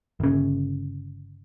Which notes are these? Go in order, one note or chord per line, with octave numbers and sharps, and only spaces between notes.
G1 C#3